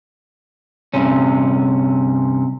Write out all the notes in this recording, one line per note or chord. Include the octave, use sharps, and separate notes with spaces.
G2 C3 C#4